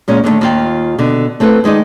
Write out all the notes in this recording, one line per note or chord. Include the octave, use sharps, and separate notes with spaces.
A#2 G#3 C#4
D3 D#3 F#3 A3
D#2 F4 G5
B2 D3
A3 C4 E4 A4 B4
D#3 G#3 D#4 D5